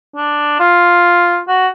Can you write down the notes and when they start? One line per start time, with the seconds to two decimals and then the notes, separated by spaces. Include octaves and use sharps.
0.16 D4
0.60 F4
1.48 F#4